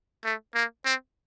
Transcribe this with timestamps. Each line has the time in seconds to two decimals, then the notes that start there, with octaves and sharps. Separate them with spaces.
0.25 A3
0.55 A#3
0.85 C4